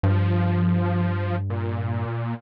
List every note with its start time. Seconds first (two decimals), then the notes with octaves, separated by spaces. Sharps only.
0.03 G2 F3
1.50 A#2